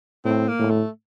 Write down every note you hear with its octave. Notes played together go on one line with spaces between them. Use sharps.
A2 C4
A#3
A2
A3